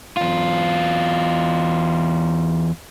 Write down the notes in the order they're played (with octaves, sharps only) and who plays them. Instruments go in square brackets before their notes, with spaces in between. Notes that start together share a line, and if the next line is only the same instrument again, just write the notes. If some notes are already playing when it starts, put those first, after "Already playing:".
[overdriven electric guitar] E2 F4